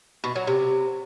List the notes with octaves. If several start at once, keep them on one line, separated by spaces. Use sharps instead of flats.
B2
F#3
C3